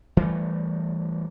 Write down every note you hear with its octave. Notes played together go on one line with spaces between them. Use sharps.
E3 G3 A3